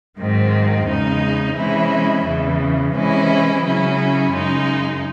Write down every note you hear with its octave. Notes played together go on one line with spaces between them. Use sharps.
G#2 D#3 F#3 C4
E2 C#3 G#3 D#4
C3 E3 G#3 C#4 E4
E2 C#3 E3
C3 E3 G#3 C#4 E4
C#3 F#3 C#4 E4
F#2 C#3 G#3 D#4